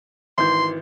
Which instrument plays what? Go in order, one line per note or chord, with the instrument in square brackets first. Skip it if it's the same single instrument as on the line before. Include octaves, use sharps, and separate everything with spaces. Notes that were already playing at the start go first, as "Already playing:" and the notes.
[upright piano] G#1 E3 G6 [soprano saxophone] C6